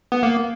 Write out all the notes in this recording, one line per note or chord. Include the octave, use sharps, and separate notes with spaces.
B3
A#3